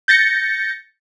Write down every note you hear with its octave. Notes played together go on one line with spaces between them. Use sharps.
G6 A6 A#6 C#7